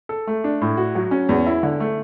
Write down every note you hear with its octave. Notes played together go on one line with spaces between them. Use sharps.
A4
A3
D4
A2
F#4
F#3
C#4
E2
E4
D3
A3